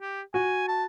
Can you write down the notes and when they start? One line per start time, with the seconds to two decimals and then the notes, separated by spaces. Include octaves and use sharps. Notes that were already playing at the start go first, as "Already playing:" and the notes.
0.01 G4
0.34 F#4 G#5
0.68 A5